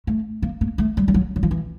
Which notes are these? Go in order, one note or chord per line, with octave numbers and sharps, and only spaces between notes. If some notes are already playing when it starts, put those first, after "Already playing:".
A3
A#3
A#3
A3
G3
G3
F#3
F#3
F3
E3